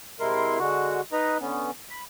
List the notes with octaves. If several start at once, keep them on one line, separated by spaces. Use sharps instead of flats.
C3 G#3 E4 A#4 C6
D3 G#3 F#4
D#4 B4 D#5 A#5
D3 B3 C#4
B5